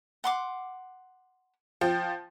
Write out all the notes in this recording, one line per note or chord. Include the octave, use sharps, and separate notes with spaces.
F#5 C6 D6
F3 G5